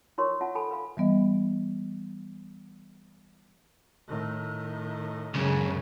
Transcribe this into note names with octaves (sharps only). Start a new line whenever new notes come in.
D#4 F4 A#4 C#5 C6 C#6
F4 E5 F#5 A5
A4 G#5 A5 B5
B4 F5 B5
E3 G3 B3 D#5
A2 D#3
C#2 F#2 C#3